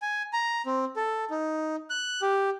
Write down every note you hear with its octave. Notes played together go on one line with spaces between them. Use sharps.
G#5
A#5
C4
A4
D#4
F#6
G4